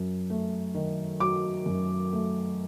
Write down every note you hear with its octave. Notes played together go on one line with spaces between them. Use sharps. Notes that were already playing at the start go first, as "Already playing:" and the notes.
Already playing: F#2
A3
D#3
F#3 D6
F#2
A3